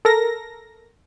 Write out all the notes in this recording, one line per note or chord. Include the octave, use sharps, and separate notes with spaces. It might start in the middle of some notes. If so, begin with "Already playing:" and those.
A4 A#4 A#6